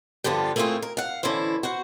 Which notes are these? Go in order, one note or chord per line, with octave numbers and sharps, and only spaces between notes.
G2 D3 F3 G3 B3 F4
A3 A#3 C4 E4 F4 G#4
A#4
F5 F#5
D3 E3 C#4 E4 C5
F#4 C5 F#5